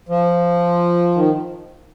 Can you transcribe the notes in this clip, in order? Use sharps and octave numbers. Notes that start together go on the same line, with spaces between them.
F3
D#3